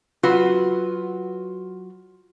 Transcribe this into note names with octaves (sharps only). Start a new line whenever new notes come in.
F#3 F4 F#4 B4